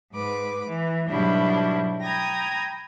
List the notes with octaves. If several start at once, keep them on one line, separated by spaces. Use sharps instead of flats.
G#2 B4 D6
E3
G#2 B2 F#3 G3 D4 E4
G5 A#5 B5 D#6 G#6